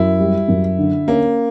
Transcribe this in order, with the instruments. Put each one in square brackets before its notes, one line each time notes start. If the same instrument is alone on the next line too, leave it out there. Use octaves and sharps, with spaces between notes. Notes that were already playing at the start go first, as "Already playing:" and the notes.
Already playing: [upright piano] F#2 [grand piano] E4
[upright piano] G3
F#2
D3
[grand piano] A#3 [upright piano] C#4